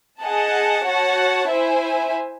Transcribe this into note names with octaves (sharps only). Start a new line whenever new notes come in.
G#4 D#5 F#5 A5
F#4 C#5 F#5 A5
E4 C5 E5 G#5